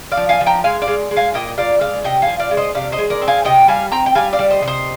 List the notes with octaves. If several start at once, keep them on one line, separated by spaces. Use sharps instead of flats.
D5 F5
F3
F5 G#5
F3
G5 A#5
G#3 F5 G#5
D5 F5
G#3
G#3
F5 G#5
A#2 D#5 G5
A#2 D5 F5
G#3 D5 F5
C3 D#5 G5
F5 G#5
F3
D5 F5
G#3
C5 D#5
C3 D5 F5
C5 D#5
G#3
A#4 D5
C4
F5 G#5
C3 D#5 G5
G3 F5 G#5
C4 G5 A#5
G5
G3 F5 G#5
D5 F5
G3
C5 D#5
C3
C5 D#5